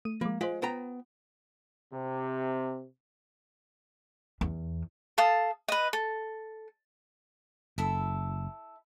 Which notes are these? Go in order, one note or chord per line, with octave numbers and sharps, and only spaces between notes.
A3 D#7
F3 G#3 A#3
G#3 F4 C5
B3 G5 A#5
C3
E2
A4 F5 A5 D#6
B4 D#5
A4
F#1 E4 A4 E5